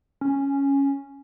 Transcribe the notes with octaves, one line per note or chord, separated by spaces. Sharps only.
C#4